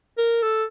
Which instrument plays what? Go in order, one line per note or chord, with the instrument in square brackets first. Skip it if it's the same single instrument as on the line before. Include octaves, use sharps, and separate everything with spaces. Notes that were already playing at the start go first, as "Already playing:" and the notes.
[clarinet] A#4
A4